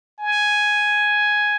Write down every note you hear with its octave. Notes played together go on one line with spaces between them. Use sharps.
G#5